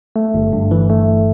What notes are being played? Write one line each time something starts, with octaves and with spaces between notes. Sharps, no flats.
A3
G1
G2
E3
A3